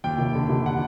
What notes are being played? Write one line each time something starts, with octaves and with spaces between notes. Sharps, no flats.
D#2 G5
F1
D3
F1
F#5